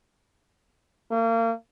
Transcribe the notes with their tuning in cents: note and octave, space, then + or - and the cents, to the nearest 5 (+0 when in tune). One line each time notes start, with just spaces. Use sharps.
A#3 -35